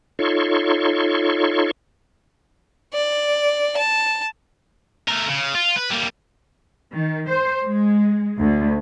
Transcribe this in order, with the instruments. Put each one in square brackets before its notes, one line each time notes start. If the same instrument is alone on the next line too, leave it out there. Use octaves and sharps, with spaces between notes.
[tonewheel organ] D#4 F4 A4 C#5 C6 C#6
[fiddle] D5
A5
[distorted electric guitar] A3 A#4
C#3
F4
B4
G3 A#3
[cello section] D#3
C5
G#3
D2